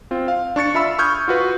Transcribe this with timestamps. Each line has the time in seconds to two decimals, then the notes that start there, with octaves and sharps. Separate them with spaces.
0.11 C4 F4
0.28 F5
0.56 D4 C#6 A6 C#7
0.74 F4 E5 B5 E6
0.99 C#6 D#6 F6 G6 G#6
1.28 F4 F#4 B4